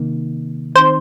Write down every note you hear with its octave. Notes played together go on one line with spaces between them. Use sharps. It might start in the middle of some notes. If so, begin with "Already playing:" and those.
Already playing: C3 D#3 A#3 D#4
D#3 C4 D#4 C5